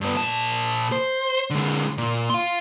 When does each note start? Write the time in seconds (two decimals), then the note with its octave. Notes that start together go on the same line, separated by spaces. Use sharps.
0.01 G2 B3
0.17 A#2 A5
0.92 C5
1.50 D3 G#3
1.98 A#2
2.30 F5 C6